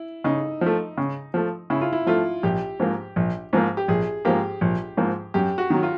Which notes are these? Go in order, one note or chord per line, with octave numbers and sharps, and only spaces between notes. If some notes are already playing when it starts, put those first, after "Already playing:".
Already playing: E4
C#3 D#4
F3
A3
C#3
F3 A3
C#3 E4
F4
E4
F3 A3 F4
A#1 G4
G#2 F3 A#3
A#1
G#2 F3 A#3
G4
A#1 G#4
G#2 F3 A#3 G4
A#1
G#2 F3 A#3
F#2 G4
F#4
D#3 F#3
F4